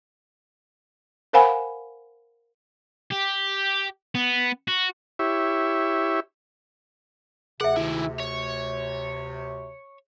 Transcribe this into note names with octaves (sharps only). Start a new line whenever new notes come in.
A#4 C5 F5 F#5 G#5 B5
G4
B3
F#4
E4 G4 C#5 E5
D2 C3 G#4 E5 F#5
D#3 E4
C#5